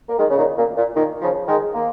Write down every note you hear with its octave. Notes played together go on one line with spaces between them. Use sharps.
A#3
D#3 G#3
C#3
A#2 D#3
A#2
A#2
A#2 D#3
C#3 F3
D#3 G#3
A#3